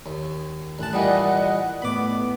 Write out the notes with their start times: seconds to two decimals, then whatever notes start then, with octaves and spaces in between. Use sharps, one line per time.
0.06 D#2
0.79 A1 A5 F#6
0.93 A#2 E3 G3 D#5 F#5
1.82 A2 B3 B5 D6